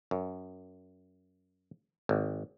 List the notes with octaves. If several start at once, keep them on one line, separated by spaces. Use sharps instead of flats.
F#2
G#1